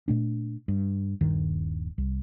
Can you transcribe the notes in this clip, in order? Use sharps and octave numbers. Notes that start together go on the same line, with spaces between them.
A#2 A3 D4
G2
D#1 G2 D#3
C2